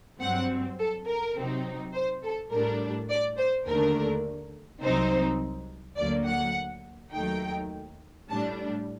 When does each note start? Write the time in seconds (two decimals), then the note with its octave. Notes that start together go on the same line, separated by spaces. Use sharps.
0.20 G2 F#3 C4 F#5
0.79 A4
1.07 A#4
1.37 C3 F#3 C4 D#4
1.94 C5
2.23 A4
2.51 A2 G3 D4 A#4
3.10 D5
3.38 C5
3.67 D#2 D3 A3 D4 A#4
4.83 C2 C3 F#3 C4 D#4 C5
5.98 D2 D3 F#3 A#3 D5
6.27 F#5
7.13 D#2 D#3 F#3 A3 D#4 G5
8.29 A2 G3 D4 A5